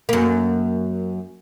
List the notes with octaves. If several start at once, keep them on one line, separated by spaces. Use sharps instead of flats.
F#2 A#3